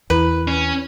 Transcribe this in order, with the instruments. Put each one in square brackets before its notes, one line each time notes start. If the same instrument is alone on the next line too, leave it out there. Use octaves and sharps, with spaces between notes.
[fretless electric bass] E2 [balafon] E4 A#5 [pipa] B4
[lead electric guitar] C#4